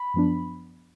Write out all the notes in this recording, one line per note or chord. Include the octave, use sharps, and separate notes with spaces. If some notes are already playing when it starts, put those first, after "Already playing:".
Already playing: B5
F#2 F3 B3 D4